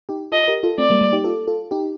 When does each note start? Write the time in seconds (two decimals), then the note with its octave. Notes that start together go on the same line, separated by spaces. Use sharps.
0.09 D#4 G4
0.32 F4 A4 D#5
0.48 G4 A#4
0.63 F4 A4
0.78 A3 C4 D5
0.90 G3 A#3
1.01 G3 A#3
1.13 D#4 G4
1.24 F4 A4
1.47 F4 A4
1.71 D#4 G4